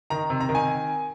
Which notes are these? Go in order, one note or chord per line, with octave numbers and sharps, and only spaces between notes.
D#3 A#5
C3
A#5
D#3
G#5